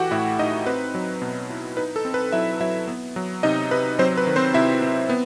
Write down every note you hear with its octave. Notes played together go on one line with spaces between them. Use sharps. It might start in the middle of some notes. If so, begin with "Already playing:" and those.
Already playing: E3 A3 F#4 G4 F#5 G5
A2 E4 E5
D#4 D#5
C4 B4
F#3
B2
E4
D#4 B4
A4
C4
B4
F#3 E4 E5
F#3 E4 E5
B3
F#3
C3 D#4 D#5
C3 B4
F#3 C4 C5
B4
D#3
C4 C5
C3 E4 E5
C4
B3